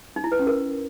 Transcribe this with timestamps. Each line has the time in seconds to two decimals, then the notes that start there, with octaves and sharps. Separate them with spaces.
0.16 D#4
0.24 E4
0.32 B4
0.39 C#4
0.47 A#4